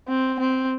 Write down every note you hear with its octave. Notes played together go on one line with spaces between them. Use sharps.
C4
C4